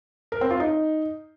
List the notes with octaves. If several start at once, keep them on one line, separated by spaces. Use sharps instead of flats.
A#4
C4
F4
D#4